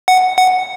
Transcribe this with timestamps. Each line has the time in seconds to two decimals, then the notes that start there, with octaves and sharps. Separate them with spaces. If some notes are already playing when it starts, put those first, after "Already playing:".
0.08 F#5
0.38 F#5